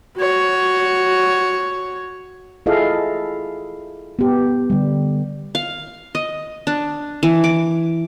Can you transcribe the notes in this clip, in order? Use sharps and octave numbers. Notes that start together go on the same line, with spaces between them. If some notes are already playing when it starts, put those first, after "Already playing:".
F#4 C#5
E4 F4 G#4 A4 D#5 F5
B3 G4
D3 G3
F5
D#5
D4
E3
D6